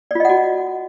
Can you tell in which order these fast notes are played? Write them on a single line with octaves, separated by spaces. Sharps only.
D5 F4 D#5 F#5 F#4